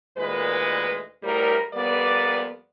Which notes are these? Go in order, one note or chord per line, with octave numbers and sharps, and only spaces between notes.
D2 A#2 D#3 G#3 B4
D2 A2 G3 A#4
F2 G3 A#3 B3 B4 D5